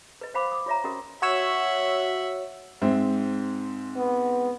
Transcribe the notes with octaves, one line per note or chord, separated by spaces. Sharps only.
B4 D#5
C5 F5 F#5 B5 D6
D6 D#6
F4 C#5 E5 A#5
C#4 F#4 A#4 D#5 F#5 D#6
F#4 C#5 E5 F#5 E6
G#2 C4 E5
B3